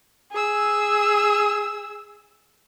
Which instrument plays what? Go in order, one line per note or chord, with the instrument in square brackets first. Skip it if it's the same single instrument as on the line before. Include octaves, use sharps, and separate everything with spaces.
[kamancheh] G#4 E6